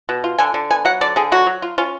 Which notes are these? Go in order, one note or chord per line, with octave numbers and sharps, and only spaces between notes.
B2
F4
D3 G#5
D3
B3 G#5
F#3 F#5
D3 D5
D3 G#4
F#3 F#4
F#3
F4
C#4 F4